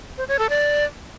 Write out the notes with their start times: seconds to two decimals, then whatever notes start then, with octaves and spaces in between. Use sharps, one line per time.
0.17 C5
0.28 C#5
0.39 A4
0.50 D5